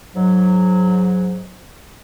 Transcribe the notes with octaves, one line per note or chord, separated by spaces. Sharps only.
G#2 F#3